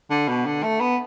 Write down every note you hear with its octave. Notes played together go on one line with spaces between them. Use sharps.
D3
B2
D3
A3
B3